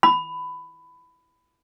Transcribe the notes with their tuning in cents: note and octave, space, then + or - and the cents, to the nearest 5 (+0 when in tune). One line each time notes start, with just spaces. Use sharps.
B5 +15